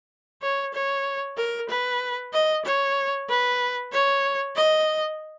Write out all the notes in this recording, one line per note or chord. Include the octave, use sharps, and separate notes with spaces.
C#5
C#5
A#4
B4
D#5
C#5
B4
C#5
D#5